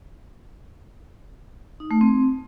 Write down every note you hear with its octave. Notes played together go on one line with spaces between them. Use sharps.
D#4
A3
C4